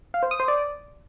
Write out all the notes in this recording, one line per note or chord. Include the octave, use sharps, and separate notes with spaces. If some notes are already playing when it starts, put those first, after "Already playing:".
F5
C5
D#6
C5
D5